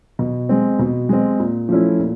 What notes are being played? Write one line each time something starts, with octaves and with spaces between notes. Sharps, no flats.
B2
G#3 C4
B2
G#3 C4
A#2
F3 A3 C#4 E4
A#2